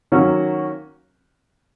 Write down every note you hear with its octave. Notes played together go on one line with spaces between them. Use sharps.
D#3 F#3 A#3 C#4 F#4